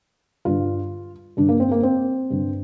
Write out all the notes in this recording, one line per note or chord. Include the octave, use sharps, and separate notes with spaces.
G2 D3 F4
G2 D3 D4
A#3
C4
A#3
C4
G2 D3